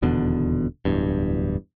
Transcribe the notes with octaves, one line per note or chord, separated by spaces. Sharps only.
D#1 E2 B2 D3
D1 E2 G2